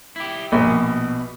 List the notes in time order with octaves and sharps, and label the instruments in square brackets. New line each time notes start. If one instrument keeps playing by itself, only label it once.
[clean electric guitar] E4 G4
[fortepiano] A#1 [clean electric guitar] B2